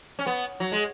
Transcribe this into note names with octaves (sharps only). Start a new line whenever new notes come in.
C#4
B3
F#3
G#3